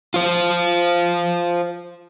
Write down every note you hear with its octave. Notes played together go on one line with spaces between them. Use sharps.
F4 C5